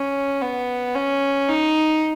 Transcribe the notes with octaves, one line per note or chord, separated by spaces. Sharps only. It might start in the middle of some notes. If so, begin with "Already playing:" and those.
Already playing: C#4
B3
C#4
D#4